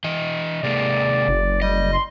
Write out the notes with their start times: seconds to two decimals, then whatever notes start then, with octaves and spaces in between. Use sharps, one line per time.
0.04 E3 D#5
0.63 C3 G#3 A#3 D5
1.28 F#1
1.62 G3 D#5
1.93 C6